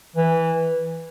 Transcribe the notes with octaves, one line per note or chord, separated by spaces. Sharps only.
E3